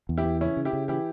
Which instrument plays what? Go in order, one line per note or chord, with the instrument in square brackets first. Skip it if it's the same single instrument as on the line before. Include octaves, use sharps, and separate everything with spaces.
[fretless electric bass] E2
[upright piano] E4 G4
[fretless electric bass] E3
[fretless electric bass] C#3 [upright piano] C#4 E4
[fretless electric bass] C#3
[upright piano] E4 G4
[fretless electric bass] C#3
[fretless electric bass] E3 [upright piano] E4 G4